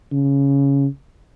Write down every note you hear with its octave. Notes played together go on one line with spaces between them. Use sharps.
C#3